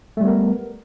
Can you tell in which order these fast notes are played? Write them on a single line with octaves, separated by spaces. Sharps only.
A3 G3 B3 A#4